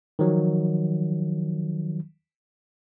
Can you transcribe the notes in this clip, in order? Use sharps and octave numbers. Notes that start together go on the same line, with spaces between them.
D#3 F3 F#3